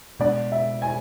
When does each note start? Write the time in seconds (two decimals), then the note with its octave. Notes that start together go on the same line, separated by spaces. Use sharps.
0.19 B2 G#3 B3 D4 D5
0.52 E5
0.82 G#5